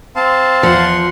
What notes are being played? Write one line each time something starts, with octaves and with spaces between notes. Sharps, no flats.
C4 F5 A5
E2 F3 F#5 C6